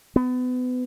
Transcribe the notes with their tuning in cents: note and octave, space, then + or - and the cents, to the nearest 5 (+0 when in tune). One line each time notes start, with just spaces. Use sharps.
B3 +30